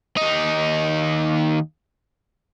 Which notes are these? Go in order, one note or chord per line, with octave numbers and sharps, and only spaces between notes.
D#2 D#4